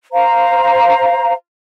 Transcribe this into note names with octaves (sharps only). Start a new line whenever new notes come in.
C5 F5 A#5